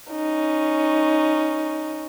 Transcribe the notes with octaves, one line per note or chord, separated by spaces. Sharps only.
C#4 D#4